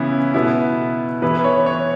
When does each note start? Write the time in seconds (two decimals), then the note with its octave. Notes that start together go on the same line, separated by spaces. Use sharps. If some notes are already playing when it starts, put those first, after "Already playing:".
Already playing: C#3 E3 B3 E4
0.34 B2 B3 E4
1.22 E3 B3 E4 B4
1.44 C#5
1.66 C#5